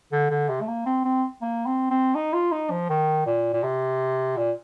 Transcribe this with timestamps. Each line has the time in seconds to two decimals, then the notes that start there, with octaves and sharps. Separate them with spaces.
0.12 D3
0.30 D3
0.49 C3
0.61 A3
0.68 A#3
0.86 C4
1.05 C4
1.42 A#3
1.66 C4
1.91 C4
2.15 D#4
2.34 F4
2.52 D#4
2.71 F3
2.90 D#3
3.26 A#2
3.53 A#2
3.63 C3
4.37 A#2